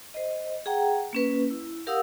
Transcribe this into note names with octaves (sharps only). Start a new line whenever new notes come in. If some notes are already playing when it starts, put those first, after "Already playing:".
C5 D#5
G#4 F#5 G5 A#5
A#3 C#4 B4
E4
G4 A#4 F5 F#5 D#6 E6